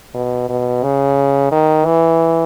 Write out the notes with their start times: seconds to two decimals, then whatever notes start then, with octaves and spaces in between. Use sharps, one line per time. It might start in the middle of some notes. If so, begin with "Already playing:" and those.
0.14 B2
0.49 B2
0.83 C#3
1.51 D#3
1.85 E3